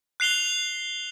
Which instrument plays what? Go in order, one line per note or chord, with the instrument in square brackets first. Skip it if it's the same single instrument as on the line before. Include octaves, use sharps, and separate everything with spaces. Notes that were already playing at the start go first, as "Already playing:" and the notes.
[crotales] F#6 C7 F7 G7